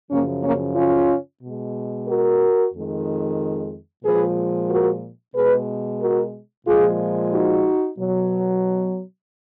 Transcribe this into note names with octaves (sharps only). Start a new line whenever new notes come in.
F#2 C#3 F3 A#3 C#4
A#3 C#4
C#4 F4
B2 G#3
F#4 A#4
F2 D#3 G#3
A#2 F3 G#3 G#4 B4
F#4 A#4
B2 G#3 G#4 B4
F#4 A#4
A#2 F3 G#3 F4 G#4
D#4 F#4
B2 F#3